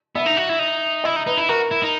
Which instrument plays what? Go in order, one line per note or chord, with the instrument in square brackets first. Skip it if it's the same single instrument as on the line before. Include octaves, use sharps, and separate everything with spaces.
[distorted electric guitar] B3 [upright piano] E5
[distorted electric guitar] D#4
F#4
E4
D#4
[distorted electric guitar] E4 [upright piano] D#5
[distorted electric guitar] D#4
[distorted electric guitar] D#4 [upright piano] B4
[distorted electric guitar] E4
[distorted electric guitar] F#4 [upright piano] A#4
[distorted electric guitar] E4
D#4